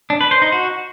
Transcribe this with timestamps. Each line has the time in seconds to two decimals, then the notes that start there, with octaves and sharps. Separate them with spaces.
0.10 D4
0.21 B4
0.31 C5
0.42 D#4
0.52 F#4